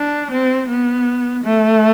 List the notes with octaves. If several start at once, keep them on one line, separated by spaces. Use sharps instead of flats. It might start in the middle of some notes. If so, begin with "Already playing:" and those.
Already playing: D4
C4
B3
A3